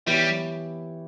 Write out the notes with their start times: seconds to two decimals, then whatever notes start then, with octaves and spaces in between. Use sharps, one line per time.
0.06 E3 G3 B3 E4 G4 C#5